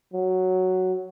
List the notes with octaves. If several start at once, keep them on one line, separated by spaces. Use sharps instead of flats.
F#3